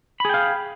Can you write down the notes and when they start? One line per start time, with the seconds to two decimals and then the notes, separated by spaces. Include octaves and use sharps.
0.20 B5
0.25 G#4
0.29 G5
0.34 F5